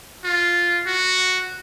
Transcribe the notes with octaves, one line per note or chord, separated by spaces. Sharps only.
F4
F#4